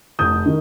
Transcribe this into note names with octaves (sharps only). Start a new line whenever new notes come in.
F1 D#6 G6
D#3